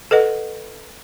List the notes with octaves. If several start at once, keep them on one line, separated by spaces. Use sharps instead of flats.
A4 B4 D#5 F#5